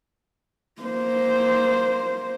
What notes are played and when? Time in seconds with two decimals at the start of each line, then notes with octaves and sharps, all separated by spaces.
0.81 A#3 C5